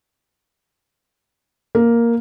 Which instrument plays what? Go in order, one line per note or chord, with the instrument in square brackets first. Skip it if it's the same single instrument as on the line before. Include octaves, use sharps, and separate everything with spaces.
[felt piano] A#3